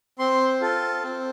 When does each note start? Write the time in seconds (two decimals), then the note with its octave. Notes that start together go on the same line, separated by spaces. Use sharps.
0.19 C4 C6
0.61 F4 A4
1.03 C4